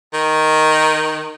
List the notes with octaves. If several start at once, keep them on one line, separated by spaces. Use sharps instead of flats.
D#3